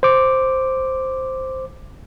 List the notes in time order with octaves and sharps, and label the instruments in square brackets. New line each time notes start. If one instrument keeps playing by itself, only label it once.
[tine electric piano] C5 D6